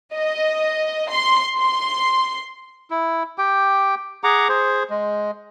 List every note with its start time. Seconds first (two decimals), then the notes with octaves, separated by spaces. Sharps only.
0.14 D#5
1.10 C6
1.57 C6
2.91 E4
3.38 G4 G5
4.24 G#4 F#5 A#5 D6
4.49 G#4 C5
4.90 G#3